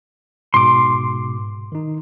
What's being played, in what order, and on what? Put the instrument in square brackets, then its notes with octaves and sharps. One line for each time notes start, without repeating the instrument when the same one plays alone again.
[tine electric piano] G#2 B2 [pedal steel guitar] C6 D6
[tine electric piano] D#3 D#4